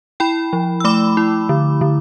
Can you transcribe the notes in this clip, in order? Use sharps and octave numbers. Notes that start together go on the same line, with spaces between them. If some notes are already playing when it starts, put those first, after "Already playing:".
E4 G5 B5
F3
E6
A3 B5 D6
E4
D3
D3